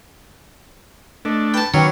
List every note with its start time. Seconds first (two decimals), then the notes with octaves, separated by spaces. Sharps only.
1.25 A3 D4 D#5
1.54 B4 G5 A5
1.74 D#3 F#3 C#4 G4 B4 C#5